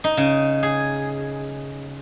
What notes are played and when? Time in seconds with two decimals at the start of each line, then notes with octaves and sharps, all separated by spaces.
0.04 D#4
0.17 C#3
0.63 G#4